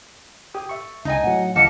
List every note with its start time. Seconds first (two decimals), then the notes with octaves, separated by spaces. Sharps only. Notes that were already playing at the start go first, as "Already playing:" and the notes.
0.54 G4 D#6
0.69 E5 C#6
1.05 C#2 D#4 D#5 G#5
1.24 A2 F#3 F#5
1.55 C#2 E3 G4 D#5 F5 A5 C#7